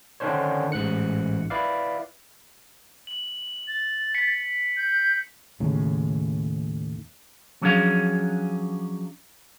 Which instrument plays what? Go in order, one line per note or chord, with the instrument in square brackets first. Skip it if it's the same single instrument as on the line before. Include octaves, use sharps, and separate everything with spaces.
[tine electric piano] D3 D#3 C#4 D4 C5 C#5
A1 G#2 F#6 C#7
E4 B4 D5 F5
[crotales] F#7
[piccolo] A6
[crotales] B6 C#7
[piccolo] G6
[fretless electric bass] D#2 A2 C#3
[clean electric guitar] F3 F#3 C#4 D4 G#4 F5